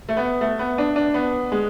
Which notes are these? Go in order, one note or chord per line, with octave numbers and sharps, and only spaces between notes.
A3
B3
A3
B3
D4
D4
B3
G#3